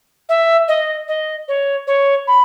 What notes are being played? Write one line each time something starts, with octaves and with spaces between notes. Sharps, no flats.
E5
D#5
D#5
C#5
C#5
B5